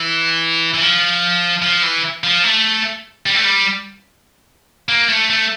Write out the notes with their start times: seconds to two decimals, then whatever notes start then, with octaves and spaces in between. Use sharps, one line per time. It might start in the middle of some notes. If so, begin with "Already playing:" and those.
Already playing: E3
0.74 E3
0.81 F3
1.62 F3
1.83 E3
2.24 F3
2.44 A3
3.26 G3
3.35 A3
3.45 G3
4.89 A#3
5.09 A3
5.30 A3